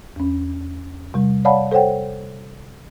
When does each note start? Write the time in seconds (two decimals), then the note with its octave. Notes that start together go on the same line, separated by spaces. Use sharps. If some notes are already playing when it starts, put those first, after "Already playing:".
0.16 E2 C#4
1.14 C3 G3
1.45 C#5 D5 F5 F#5 A5 B5
1.71 A4 C5 C#5 F#5 G5